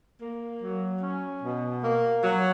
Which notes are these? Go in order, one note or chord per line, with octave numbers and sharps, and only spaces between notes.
A#3
F#3
C#4
B2
A#3
F#3